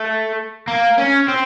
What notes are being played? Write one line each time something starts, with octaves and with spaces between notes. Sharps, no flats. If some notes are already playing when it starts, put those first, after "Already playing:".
Already playing: A3
A#3
C#4
C4